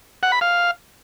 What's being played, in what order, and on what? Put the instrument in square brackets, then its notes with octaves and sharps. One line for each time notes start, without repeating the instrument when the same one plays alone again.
[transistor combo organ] F#5
B5
F5